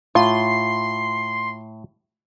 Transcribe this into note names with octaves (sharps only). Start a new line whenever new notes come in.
A2 F4 C6